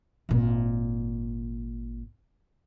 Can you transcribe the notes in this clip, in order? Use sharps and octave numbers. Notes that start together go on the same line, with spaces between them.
G#1 A#2